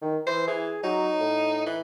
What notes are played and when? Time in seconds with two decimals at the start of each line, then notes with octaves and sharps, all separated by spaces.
0.01 D#3
0.27 E3 C5
0.47 E3 G#4
0.83 F#3 D#4
1.20 A2
1.66 E3